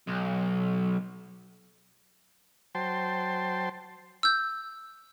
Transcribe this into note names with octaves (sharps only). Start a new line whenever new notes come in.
B1
F#3 C5 G5 A5 C6
E6 G6